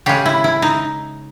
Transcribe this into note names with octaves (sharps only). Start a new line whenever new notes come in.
C#3 G#3 G4
E4
E4
D#4